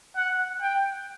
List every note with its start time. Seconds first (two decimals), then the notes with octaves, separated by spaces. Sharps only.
0.16 F#5
0.61 G5